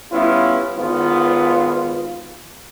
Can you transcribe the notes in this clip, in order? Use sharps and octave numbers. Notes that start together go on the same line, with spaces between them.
G3 B3 C#4 E4 F4
G#1 B3 F4